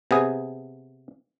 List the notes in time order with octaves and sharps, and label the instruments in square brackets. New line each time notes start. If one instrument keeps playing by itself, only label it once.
[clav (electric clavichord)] C3 B3 G#4